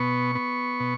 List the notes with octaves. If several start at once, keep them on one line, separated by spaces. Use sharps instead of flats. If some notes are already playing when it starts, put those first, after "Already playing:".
Already playing: B2 B3 C#6
B3
B2